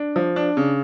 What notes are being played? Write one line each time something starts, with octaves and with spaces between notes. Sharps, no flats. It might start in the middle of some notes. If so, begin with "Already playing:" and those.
Already playing: D4
F3
D4
C#3